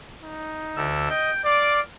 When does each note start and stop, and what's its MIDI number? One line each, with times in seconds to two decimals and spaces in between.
0.23 0.88 63
0.76 1.08 38
0.76 1.08 50
0.76 1.08 88
1.09 1.31 75
1.09 1.41 79
1.09 1.41 91
1.45 1.81 74
1.45 1.80 77
1.45 1.80 86